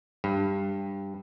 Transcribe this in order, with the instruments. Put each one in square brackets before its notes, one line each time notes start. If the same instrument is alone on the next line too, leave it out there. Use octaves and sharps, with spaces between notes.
[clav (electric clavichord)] G2